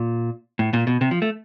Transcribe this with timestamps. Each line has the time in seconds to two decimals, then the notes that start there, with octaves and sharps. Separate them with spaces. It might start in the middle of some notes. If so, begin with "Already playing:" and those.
Already playing: A#2
0.59 A2
0.73 A#2
0.87 B2
1.01 C3
1.11 F3
1.22 A3